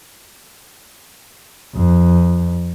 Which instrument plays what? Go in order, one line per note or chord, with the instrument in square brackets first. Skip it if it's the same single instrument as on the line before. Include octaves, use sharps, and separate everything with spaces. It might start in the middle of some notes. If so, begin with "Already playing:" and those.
[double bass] F2